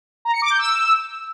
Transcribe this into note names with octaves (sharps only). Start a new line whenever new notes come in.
A#5
C#7
D6
G6
E6